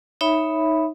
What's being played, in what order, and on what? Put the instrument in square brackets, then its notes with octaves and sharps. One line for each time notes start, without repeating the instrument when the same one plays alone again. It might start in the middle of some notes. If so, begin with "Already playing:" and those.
[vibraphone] D#4 C#5 E5 B5